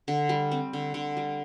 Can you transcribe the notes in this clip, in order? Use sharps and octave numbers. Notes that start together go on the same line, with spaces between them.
D3
G3
C4
D3
D3
G3